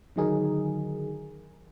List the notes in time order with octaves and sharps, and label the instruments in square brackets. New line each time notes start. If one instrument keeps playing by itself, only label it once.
[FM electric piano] D3 D#3 F#3 D#4 G#4 A#4